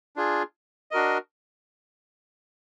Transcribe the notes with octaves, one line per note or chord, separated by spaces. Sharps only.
D4 F4 G#4
D4 F#4 A#4 D#5